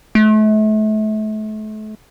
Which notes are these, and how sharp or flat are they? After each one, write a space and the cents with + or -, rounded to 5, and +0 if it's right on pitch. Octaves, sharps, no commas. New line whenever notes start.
A3 -35